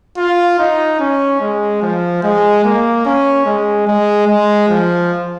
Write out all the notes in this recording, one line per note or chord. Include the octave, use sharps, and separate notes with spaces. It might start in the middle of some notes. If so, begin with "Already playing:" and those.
F4
D#4
C#4
G#3
F3
G#3
A#3
C#4
G#3
G#3
G#3
F3